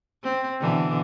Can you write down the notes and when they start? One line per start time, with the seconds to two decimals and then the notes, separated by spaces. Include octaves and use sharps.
0.24 C4
0.61 B2 D3 E3